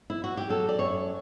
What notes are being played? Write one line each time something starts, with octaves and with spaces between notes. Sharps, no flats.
E4
F#4
G4
F#3 A4
D5
F#2 C#5